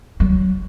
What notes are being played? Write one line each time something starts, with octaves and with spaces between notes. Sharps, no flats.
F#3